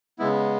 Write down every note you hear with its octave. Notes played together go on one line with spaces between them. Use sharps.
C#3 G#3 B3 E4